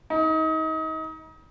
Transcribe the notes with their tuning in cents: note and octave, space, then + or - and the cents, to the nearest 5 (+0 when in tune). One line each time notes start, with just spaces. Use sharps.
D#4 +30